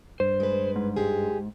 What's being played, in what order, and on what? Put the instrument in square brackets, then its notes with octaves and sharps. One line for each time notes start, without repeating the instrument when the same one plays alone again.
[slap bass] G2 [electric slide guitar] C5
[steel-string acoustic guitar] G#3 B4
[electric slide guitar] G#2
[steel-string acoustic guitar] G#3 G4 G#4